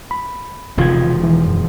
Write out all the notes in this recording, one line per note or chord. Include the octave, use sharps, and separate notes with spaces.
B5
E1 C3 D#3 F3 F4 G#6
E3
F#2